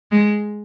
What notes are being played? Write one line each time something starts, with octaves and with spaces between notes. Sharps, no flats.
G#3